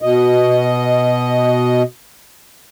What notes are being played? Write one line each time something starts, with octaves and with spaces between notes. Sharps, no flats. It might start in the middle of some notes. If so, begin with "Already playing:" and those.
B2 D#5